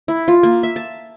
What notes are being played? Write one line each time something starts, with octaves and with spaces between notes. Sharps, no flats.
E4
F4
A#3
E5
A5